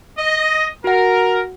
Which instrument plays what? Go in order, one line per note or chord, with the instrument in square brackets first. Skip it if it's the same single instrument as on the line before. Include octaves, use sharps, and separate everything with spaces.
[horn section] D#5
[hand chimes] F#4 F#5 [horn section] A#4